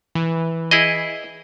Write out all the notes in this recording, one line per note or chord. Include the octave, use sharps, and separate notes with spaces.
E3
E4 G#4 D#5